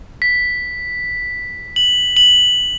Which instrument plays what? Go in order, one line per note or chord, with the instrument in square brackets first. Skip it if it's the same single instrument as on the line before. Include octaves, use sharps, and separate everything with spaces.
[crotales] B6
F#7
F#7